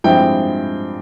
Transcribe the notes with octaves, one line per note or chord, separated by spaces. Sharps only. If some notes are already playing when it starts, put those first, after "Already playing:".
G2 F3 G#3 C4 E4 G5